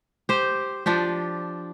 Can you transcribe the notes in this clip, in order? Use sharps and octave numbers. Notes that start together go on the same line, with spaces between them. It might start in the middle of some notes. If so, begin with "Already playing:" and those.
G4 C5
F3 D4 G4